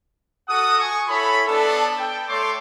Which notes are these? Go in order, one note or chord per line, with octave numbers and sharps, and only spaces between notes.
F#4 A4 F#5 D#6
G#5 C#6
E4 A4 C#5 B5
B3 D4 A4
G5
A3 A4 C#5 C6 D6